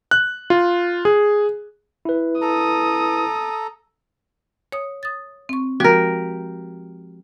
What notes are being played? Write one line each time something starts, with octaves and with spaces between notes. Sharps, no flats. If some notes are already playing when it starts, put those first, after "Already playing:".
F#6
F4
G#4
E4 B4
A4 A#5 D#6
C#5 D#6
D#6 A6
C4 C#6
F3 G#3 F#4 G4 A#4